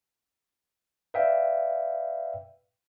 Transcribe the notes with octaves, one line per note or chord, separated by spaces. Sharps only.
B4 D5 E5 F5 G5